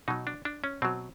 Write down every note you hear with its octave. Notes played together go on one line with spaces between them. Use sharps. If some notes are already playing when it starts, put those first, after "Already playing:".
B2 F#3 D#4
D4
D4
C#4
B2 F#3 C4